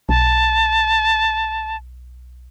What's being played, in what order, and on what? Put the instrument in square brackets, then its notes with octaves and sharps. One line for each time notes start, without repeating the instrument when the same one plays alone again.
[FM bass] B1 [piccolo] A5